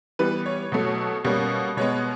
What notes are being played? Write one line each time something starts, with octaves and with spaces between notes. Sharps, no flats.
E3 G3 B3 B4
C#5
B2 F#3 A3
B2 G3 A#3 C#4
B2 G#3 B3 C#5